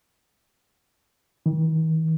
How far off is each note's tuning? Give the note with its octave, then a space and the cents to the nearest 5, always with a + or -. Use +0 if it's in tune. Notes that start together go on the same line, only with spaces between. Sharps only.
D#3 +45